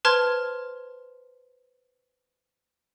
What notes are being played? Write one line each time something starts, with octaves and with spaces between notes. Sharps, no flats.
B4 C5 A5 C6 F6 G#6